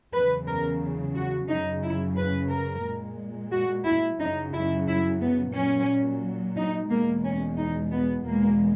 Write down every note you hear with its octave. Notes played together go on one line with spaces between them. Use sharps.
E2 C#3 F#3 B4
A#4
F#4
F#2 C#3 F#3 D#4
E4
B4
A#4
A#2 G#3
F#4
E4
F#2 C#3 F#3 D#4
E4
E4
B3
A#2 F#3 C#4
D#4
E2 B2 G#3 A#3
C#4
D#4
B3
E2 B2 G#3 A#3